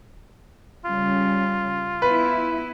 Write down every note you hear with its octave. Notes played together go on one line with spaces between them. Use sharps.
C#3 G3 F4
B3 E4 B4